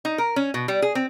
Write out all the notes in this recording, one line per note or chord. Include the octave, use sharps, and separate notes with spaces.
D#4
A#4
C#4
B2
G3
G#4
C4